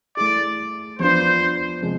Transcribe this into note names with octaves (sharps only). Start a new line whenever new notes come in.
A3 E4 G#4 D5
F3 B3 D4 F4 C5
C3 F3 G#3